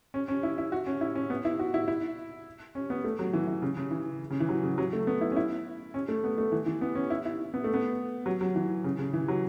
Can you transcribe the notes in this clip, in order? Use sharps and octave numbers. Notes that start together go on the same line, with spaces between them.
C#4
C#4
E4
E4
F#4
C#4
E4
C#4
B3
E4
F#4
E4
E4
C#4
B3
A3
F#3
E3
E3
C#3
C#3
E3
C#3
E3
F#3
C#3
F#3
A3
B3
E4
C#4
E4
C#4
A3
B3
A3
E3
E3
B3
C#4
E4
E4
B3
A3
B3
F#3
F#3
E3
C#3
C#3
E3
F#3